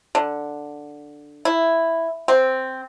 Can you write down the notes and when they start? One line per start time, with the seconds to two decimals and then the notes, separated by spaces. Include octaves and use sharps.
0.15 D3
1.45 E4
2.28 C4